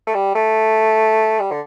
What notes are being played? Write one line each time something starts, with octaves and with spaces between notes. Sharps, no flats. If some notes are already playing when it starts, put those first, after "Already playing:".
A3
G3
A3
G3
D3